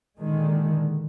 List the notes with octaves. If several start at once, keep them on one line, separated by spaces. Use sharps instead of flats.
A#2 D3 D#3 G#3